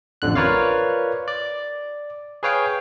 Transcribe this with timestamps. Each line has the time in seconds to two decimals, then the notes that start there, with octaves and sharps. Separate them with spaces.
0.22 A1 F2 D3 F#6
0.35 F4 A#4 B4 C#5 D5 F5
1.28 D5
2.43 G#4 B4 C#5 F5 G5